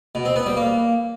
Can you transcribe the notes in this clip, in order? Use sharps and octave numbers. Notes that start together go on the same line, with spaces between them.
B2
C4
B3
G3
A#3